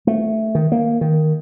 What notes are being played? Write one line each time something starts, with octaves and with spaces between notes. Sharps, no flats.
A3
D#3
A#3
D#3